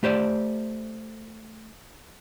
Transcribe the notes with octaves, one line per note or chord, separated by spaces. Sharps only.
A3 G4 C5 D5